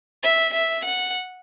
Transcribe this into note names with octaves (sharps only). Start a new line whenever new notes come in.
E5
E5
F#5